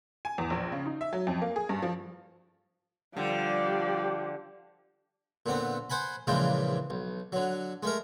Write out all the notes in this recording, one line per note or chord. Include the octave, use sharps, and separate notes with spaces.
G#5
E2
A#1
C#3
D#4
E5
F#3
F2
A#3
G#4
G2
F3
D3 F3 G3 G4 D5
A#2 D3 B3 C4
C5 F#5 G#5 B5
A#1 A#2 C#3 E3 G#3 G5
B1
D3 F#3
G#3 A3 A#4